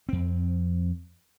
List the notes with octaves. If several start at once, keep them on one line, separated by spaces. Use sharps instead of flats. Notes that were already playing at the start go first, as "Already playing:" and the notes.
F2 C4